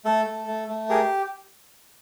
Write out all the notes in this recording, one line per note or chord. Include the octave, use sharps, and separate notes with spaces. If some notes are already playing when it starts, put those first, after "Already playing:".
A3 A4
A3
A3
A3
G4 G#4 A#4